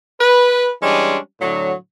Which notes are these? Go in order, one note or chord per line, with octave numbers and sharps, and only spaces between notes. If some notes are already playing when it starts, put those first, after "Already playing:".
B4
E3 G3 G#3 C#4 D4
A2 D3 F#3